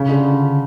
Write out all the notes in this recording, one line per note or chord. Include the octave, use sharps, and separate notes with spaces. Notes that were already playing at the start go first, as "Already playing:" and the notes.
Already playing: C#3
D3